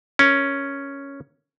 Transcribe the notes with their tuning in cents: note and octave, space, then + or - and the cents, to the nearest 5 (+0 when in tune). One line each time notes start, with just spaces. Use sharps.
C#4 +0 A#4 +0